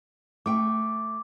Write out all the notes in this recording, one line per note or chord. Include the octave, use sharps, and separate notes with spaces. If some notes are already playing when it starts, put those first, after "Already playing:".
A3 G5 D6